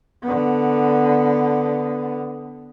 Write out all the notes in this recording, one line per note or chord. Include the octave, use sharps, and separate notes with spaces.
D3 B3